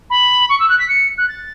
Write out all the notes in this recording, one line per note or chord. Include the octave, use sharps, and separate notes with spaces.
B5
C#6
E6
F#6
B6
C#7
F#6
A6